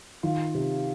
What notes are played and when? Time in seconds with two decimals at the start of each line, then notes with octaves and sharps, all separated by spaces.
0.23 D#3 F4
0.55 C3